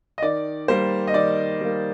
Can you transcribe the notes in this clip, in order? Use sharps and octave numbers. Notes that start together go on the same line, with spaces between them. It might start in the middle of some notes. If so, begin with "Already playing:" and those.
D#5
D#3 D5
G3 A#3 C5
D#5
D#3 D5
G3 A#3